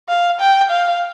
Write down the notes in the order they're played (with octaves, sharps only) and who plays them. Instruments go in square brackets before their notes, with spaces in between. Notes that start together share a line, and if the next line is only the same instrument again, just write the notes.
[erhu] F5
G5
F5